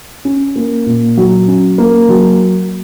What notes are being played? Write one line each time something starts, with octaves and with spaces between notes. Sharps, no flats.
C#4
A#3
A#2
F#3
C#4
A#3
F#3